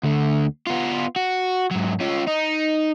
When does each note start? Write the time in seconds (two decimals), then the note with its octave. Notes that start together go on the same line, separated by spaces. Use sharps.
0.03 D2 D3
0.67 B3 F4
1.16 F#4
1.71 G#2 F#3
2.00 C#4 F4
2.27 D#4